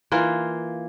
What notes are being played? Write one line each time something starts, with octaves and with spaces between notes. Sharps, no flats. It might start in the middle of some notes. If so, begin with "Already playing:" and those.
E3 A#3 F4